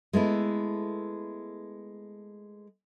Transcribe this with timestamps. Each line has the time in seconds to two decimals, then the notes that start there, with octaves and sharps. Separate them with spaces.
0.13 G#3 A3 B3 E4